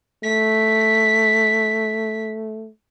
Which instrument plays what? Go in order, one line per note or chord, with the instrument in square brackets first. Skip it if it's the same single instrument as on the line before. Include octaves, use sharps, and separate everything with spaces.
[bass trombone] A3 [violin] B6